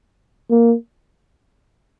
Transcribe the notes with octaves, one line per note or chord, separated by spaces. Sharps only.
A#3